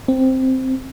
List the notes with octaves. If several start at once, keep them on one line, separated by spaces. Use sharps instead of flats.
C4